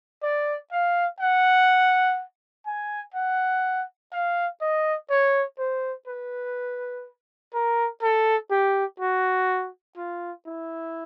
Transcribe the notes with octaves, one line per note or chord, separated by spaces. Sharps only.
D5
F5
F#5
G#5
F#5
F5
D#5
C#5
C5
B4
A#4
A4
G4
F#4
F4
E4